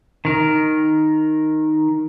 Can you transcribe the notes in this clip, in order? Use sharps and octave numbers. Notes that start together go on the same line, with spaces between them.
D#3 A#4